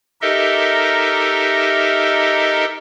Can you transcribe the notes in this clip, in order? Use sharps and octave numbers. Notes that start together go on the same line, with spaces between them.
D#4 G4 A4 A#4 D#5 E5